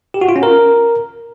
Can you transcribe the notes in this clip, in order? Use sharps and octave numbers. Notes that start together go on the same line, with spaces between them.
G4
F#4
F4
C#4
A#4